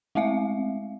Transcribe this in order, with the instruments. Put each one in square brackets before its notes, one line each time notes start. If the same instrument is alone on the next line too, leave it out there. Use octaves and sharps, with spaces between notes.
[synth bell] G#3 A3 C4 E5 F5